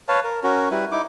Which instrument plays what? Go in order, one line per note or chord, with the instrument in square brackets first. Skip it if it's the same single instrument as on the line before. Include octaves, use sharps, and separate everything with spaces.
[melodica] B4 C#5 F5 A5
A#4
C#4 F#4 A#4
G3 E4 B4
D#4 E4 D6